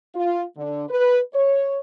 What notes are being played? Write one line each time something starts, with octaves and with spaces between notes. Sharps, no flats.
F4
D3
B4
C#5